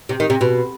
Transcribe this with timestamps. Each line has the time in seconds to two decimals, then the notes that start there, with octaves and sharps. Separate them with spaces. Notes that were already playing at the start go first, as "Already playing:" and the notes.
0.09 C3
0.20 D#3
0.30 C3
0.41 B2